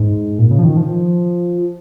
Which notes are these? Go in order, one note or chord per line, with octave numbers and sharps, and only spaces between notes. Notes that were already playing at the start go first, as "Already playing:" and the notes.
Already playing: G#2
A#2
C#3
F3
D#3
F3